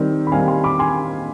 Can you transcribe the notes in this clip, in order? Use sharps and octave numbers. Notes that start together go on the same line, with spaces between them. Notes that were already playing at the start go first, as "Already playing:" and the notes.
Already playing: D#3 G3 C4
B5
D#3 G3 C4 F5 G#5
G#5 C6
B5 D6
G#5 C6